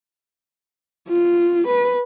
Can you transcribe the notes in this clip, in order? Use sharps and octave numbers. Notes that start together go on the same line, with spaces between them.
F4
B4